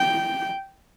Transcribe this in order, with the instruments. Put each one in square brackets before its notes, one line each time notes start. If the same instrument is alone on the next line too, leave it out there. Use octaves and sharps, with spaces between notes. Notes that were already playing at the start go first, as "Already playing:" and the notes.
Already playing: [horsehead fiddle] G5